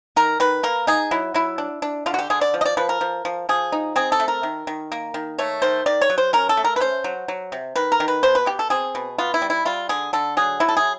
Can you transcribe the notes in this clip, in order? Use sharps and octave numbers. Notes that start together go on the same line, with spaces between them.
D#3 A#4
D#3 B4
A#3 A#4
D#4 G#4
F#3 E4
F#3 E4
D4
D4
D3 F4
F#4
G4
D3 G#4
D5
F3
D#5
D5
F3 B4
A#4
F3
F3
F3 G#4
D#4
C4 G#4
A4
A3
A#4
D#3
D#3
A#3
D#3
A3 C#5
D#3 C5
D#3 D5
C#5
F#3
C5
C#4 A#4
A4
A3
A#4
B4
C#4 C5
F#3
F#3
C3
D#3 B4
A#4
D#3
B4
B2 C5
B4
B2 G4
A4
C4 G#4
B2
B3 F4
E4
G3
E4
G3 F4
D3 G#4
D3 A4
F#3 G#4
F#3 E4
A4
G#4